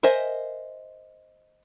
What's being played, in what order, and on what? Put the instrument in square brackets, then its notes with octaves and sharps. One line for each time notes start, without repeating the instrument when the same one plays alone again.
[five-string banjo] A#4 C5 D#5 E5 G#5